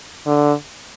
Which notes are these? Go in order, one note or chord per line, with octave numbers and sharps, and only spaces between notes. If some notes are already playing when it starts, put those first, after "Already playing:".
D3